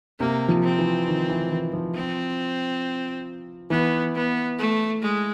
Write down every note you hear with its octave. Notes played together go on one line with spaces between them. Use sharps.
C3 A#3
F3
C4
E3
D#3
E3
E3
F3
C4
E3 B3
B3
A3
G#3